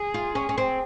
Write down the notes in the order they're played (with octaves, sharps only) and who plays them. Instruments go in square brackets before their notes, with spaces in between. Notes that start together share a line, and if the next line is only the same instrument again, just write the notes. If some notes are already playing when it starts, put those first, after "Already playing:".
Already playing: [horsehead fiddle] G#4
[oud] F4
C#4
C#4
C4